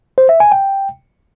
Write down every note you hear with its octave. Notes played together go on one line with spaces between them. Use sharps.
C5
E5
G#5
G5